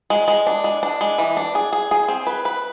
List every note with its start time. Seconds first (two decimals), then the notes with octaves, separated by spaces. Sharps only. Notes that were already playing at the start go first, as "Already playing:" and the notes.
0.10 G#3
0.28 G#3
0.47 D4
0.64 G#3
0.83 D4
1.01 G#3
1.18 E3
1.37 D4
1.55 G#4
1.73 G#4
1.91 G#4
2.08 C4
2.27 B4
2.45 B4